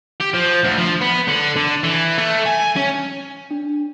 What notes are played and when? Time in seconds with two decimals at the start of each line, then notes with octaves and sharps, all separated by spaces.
0.21 G4
0.35 F3
0.64 D2
0.79 F3
1.01 B3
1.28 D3
1.56 D3
1.84 E3
2.18 A3
2.46 G#5
2.76 C#4
3.51 D4